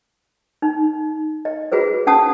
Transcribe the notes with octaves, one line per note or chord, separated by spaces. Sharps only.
D#4
D#5
F4 F#4 G#4 B4 C5
C#4 F#5 A5 D#6